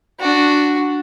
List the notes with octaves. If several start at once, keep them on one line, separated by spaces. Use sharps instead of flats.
D4 F#4